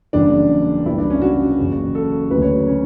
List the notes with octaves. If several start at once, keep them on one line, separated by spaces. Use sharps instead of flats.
F#1 E2 C#3 G3 D4
C#2 B2 G3 E4
D4
C#4
F#4
F#1 E2 C#3
A4
D2 C#3 F#3 B4
C#5
C#4